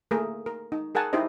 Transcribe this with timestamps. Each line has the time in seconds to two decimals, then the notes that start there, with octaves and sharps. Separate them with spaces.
0.11 A3 A#3 G#4 A#4
0.46 A#4
0.72 D#4
0.95 G#4 A#4 F#5 G#5 A5
1.13 D#4 E4 G4 C5 D#5